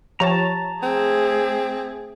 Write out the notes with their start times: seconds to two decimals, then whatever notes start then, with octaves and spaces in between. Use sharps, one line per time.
0.20 F3 G4 C#5 A5 A#5
0.83 A3 C4 G#4